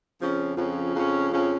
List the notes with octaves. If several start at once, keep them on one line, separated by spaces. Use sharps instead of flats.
F2 C#3 F3 C#4
F2 C#3 F3 C#4
F2 C#3 F3 C#4
F2 C#3 F3 C#4